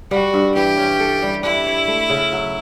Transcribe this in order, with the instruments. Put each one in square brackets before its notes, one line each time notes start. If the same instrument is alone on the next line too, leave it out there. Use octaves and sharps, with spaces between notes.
[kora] G3 [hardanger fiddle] F#4
[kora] G2
[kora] E3 [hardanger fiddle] G4
[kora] C#4
A4
G3
[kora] D4 [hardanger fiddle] E4
[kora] C#5
A3
C#3
F#3